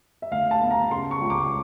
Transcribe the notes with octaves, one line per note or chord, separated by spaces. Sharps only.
E5
D2 F5
A5
B3
A#5
C#3 C6
C#6
C#2
D6